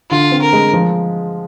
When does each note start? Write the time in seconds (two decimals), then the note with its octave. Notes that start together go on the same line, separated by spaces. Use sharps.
0.10 D3 F4
0.32 C4
0.42 A#4
0.53 G#3
0.73 F3